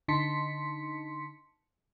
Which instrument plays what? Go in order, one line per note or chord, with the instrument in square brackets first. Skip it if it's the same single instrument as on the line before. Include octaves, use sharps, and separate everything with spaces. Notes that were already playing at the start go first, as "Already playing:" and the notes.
[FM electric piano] D3 D#4 A5 C6 B6 C#7